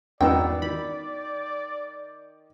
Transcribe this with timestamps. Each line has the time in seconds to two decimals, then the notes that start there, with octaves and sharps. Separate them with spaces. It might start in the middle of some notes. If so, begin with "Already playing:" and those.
0.21 G#1 E2 B3 C#4 D#4 D5 G5 E6
0.62 D#3 B5